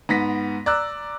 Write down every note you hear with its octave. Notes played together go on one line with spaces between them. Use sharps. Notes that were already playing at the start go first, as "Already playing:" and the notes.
G#2 B3 A#6 B6
D5 A#5 E6 F#6